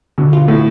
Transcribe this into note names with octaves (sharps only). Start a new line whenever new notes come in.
B2 D3
F4
A2 A3